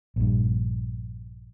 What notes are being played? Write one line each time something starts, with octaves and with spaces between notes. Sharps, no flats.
A#1 G2